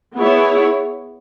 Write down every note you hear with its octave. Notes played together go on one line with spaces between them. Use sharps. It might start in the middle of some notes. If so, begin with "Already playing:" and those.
B3 E4 G#4 C#5